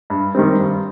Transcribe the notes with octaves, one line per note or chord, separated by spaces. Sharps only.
G2
D#3 G3 C4
G2